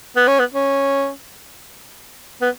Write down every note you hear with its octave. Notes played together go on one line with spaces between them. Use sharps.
B3
C#4
B3
C#4
B3